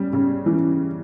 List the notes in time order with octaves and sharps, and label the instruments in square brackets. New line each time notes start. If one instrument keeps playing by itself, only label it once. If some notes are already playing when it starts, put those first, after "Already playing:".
Already playing: [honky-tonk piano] C#3 G3
C#3
E3